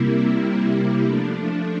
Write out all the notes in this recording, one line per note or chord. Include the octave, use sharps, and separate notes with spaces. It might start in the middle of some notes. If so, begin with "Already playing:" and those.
Already playing: C3 G3 A#3 E4
F3 A3 D4